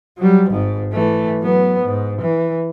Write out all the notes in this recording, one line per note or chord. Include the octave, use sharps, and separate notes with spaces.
F#3 G3
G#1 G#2
E3 A3
F#3 B3
G#2
E3